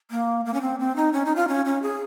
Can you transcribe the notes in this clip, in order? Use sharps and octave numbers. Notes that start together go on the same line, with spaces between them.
A#3
A#3
C#4
C4
C4
D#4
C#4
D#4
F4
C#4
C#4
G#4